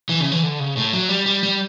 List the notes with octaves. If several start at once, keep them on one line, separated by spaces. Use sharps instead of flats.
E3
C#3
E3
D3
C#3
A2
F#3
G3
G3
G3